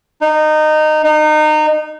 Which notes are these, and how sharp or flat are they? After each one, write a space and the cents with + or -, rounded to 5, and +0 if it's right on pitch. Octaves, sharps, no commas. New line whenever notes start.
D#4 -20
D#4 -25